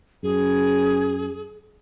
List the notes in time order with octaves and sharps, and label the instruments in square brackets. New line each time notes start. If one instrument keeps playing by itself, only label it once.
[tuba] F#2 [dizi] G#4